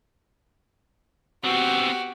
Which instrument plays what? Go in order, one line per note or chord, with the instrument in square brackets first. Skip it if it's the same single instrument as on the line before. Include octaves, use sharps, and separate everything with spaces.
[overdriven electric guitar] B3 C4 [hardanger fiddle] F#4 G4